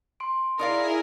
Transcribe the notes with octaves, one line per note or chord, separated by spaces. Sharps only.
C6 D7
D#4 E4 G#4 A#4 D5 F5